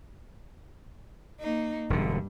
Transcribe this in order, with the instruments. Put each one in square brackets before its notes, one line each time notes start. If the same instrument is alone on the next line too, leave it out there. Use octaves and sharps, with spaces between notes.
[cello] A#3 D#4
[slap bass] E1 D3 [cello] G2